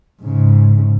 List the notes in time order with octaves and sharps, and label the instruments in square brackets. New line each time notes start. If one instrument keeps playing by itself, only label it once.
[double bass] G#2 C#3